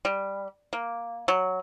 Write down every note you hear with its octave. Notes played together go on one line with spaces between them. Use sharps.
G3
A#3
F#3